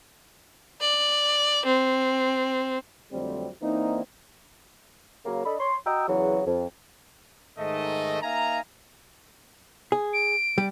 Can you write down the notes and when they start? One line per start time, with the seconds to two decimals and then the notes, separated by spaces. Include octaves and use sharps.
0.81 D5
1.65 C4
3.12 F2 D3 F#3 G3 A3 C4
3.62 E3 A#3 C4 D4 D#4
5.26 C#3 F#3 A#3
5.45 D4 A4 D#5 B5
5.60 C#5 C6
5.86 F#4 D#5 G5 A#5 E6
6.08 E2 C#3 E3 F#3
6.47 F2
7.59 G#2 D#3 A3 D#5
8.22 A#3 D#4 E5 F5 G#5 A#5
9.92 G#4
10.13 D7
10.58 G3